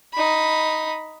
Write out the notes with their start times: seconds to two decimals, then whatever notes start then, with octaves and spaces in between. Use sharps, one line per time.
0.13 D#4 B5